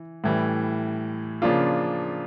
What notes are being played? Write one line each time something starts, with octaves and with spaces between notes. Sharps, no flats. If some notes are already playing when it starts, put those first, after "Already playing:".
Already playing: E3
A2 E3 G3
C#3 F3 A#3 D4 F4